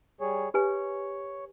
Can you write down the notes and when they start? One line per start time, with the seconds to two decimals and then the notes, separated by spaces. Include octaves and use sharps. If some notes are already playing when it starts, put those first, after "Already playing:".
0.21 G3 G#4 C#5
0.54 G4 B4 C#5 G#5